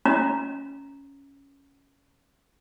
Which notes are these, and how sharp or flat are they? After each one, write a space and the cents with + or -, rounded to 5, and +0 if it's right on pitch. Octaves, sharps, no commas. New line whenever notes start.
C#4 +0 A#5 +0